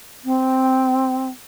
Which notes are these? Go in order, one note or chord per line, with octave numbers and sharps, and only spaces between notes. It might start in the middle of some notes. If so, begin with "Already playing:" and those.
C4